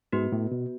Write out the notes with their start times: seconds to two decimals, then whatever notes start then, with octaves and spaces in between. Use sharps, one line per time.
0.12 G#2 B3 F#4 B4
0.32 A2
0.52 B2